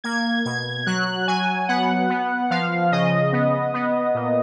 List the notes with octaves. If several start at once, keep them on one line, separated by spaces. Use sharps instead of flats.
A#3 G#6
B2 G#6
F#3 F#6
F#3 G#5
B3 F#5
B3
F3 F5
C#3 D#5
B3
B3
A#2